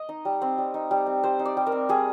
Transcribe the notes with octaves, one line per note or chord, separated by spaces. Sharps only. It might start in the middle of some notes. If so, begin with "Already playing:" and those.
Already playing: D#5
D#4
G3
C4
G3
D#4
G3
C4
G3 C5
D#4
D5
G3
A#4
C4
G3 G#4